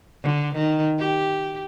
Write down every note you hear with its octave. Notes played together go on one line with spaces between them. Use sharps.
D3
D#3
G4